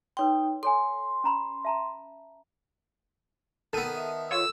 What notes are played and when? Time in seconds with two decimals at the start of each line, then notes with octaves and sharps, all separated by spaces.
0.17 D#4 B4 C#5 G5 C6
0.63 A4 C#5 G#5 C6
1.24 C#4 A#5 B5
1.65 E5 A5 A#5
3.73 D#3 B3 A4 D#7
3.95 E5 A5
4.31 F4 A4 C#5 E6